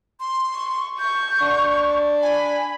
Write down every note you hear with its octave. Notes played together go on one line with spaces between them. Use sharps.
C6
C#6
C#6 G6
D4
G#5 B5